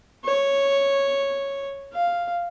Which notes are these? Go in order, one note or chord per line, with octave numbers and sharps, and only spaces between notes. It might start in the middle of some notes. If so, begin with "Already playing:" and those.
C#5
F5